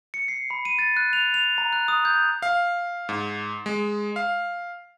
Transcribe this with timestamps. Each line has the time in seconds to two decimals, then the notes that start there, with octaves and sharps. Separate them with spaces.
0.14 C#7
0.28 C7
0.50 B5
0.65 D#7
0.79 A6
0.97 F#6
1.13 F7
1.34 F7
1.58 A#5
1.73 F#6
1.88 D#6
2.05 G6
2.42 F5
3.09 G#2
3.66 G#3
4.16 F5